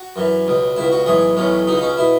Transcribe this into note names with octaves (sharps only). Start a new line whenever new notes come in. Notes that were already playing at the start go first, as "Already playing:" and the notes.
Already playing: F#4
F#2 E3
C#2 B2
C#2 B2 E4
F#4
B1 A2 E3 G#4
B1 A2 E3 C#4
C#2 B2 D#4
D#4
C#4
B2 E4